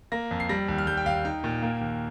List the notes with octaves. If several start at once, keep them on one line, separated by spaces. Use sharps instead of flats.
A#3 A#6
F2
C7
G3 A#6
D#2
F6
G3 G6
G5
D#2 F5
D#4 G5
A#2
A#3
D#2